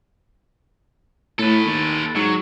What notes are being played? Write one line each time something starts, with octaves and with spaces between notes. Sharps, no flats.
A2 A4 B4
D#2
G#2 F#3